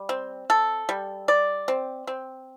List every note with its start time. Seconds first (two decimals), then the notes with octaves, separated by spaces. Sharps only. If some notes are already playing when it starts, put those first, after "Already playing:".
Already playing: G3
0.09 C4
0.50 A4
0.89 G3
1.28 D5
1.68 C4
2.07 C4